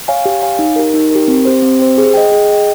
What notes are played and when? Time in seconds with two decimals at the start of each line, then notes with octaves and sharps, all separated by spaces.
0.08 C#5 F5 G#5
0.26 G4
0.42 C#5 F5 G#5
0.59 D#4
0.76 G4 A#4
0.94 D#4
1.11 G4 A#4
1.28 C4
1.45 G4 C5
1.62 C4
1.79 G4 C5
1.98 G#4
2.14 D#5 G5
2.32 G#4
2.49 D#5 G5